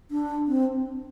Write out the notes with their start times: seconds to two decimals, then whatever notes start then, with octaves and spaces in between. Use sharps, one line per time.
0.11 D4
0.48 C4